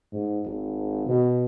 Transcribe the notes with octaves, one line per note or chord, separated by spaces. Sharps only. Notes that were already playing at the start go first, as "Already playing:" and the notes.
G#2
G#1
B2